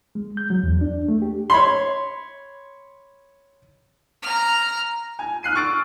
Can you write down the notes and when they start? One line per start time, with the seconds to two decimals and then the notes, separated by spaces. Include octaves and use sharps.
0.15 G#3
0.37 G6
0.50 F#3
0.63 E2
0.81 D4
1.08 A3
1.22 G4
1.50 C#5 B5 C6
4.22 A#5 F6
5.19 G#5
5.43 F6 F#6 C7 D#7
5.55 C#6 E6 A6 D7